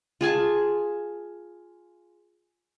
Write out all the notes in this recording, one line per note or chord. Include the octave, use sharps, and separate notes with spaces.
F4 G#4 G#5 A5